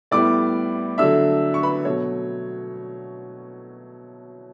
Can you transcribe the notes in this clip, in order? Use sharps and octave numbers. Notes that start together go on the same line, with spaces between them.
A2 G3 B3 E4 D5 D6
D3 F#3 A3 D4 E5 E6
C#6
B4 B5
B2 F#3 A3 C#5